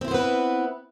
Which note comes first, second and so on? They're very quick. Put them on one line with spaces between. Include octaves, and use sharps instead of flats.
C4 E4 C5 B3 B4